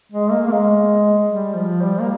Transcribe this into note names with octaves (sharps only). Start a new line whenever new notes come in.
G#3
A#3
A#3
G#3
G3
F3
G3
A#3